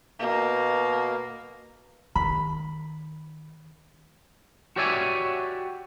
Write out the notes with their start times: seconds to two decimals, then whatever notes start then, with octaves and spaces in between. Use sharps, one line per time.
0.19 B2 A#3
2.15 D#3 B5
4.76 F#4 G4 C#5 D5 E5 G#5